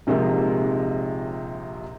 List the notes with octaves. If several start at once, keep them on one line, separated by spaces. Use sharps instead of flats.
A#1 C3 F3 G#3 D#4 A#4